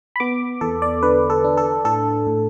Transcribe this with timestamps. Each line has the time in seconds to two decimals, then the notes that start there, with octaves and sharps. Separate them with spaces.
0.16 B5
0.20 B3 D6
0.61 E2 A4
0.82 D5
1.03 D3 B4
1.30 A4
1.44 D4
1.57 A4
1.85 A2 A4
2.27 A2